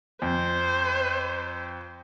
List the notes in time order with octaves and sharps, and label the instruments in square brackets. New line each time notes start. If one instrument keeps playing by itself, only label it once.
[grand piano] F2 [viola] C5